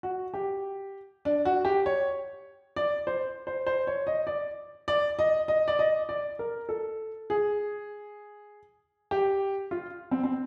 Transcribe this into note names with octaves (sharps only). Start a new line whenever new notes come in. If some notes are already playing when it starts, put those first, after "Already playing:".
F#4
G4
D4
F#4
G4
C#5
D5
C5
C5
C5
C#5
D#5
D5
D5
D#5
D#5
D5
D#5
D5
A#4
A4
G#4
G4
F4
C4
C4